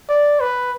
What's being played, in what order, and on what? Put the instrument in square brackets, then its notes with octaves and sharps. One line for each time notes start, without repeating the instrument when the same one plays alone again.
[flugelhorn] D5
B4